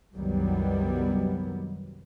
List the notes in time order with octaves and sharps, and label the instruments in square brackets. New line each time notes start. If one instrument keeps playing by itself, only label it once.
[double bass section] C2 F#2 D#3 F#3 G3 B3